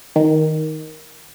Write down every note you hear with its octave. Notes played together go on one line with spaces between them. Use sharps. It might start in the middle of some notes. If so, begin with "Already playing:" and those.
D#3